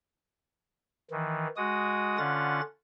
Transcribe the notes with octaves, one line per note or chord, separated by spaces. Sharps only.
D#3 E3
G#3 F#4 D#6
D3 C#4 F4 F#5 A6